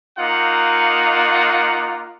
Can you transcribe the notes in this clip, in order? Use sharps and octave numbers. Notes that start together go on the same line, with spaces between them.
A#3 D#4 F4 F#5